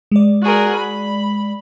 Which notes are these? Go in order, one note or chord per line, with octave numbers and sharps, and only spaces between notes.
G#3 D5
F#4 G#4 A#4
B5